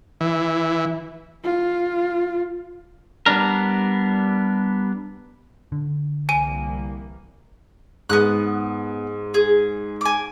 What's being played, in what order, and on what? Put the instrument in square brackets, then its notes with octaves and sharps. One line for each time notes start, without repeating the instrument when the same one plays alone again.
[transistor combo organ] E3
[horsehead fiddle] F4
[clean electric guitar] G3 B3 D4 A#4
[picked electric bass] D3
[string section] C2 E3 A#3 [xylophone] G#5 D#7
[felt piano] G#2 [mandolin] B3 D#6 F#6
[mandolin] G#4
G#5 D6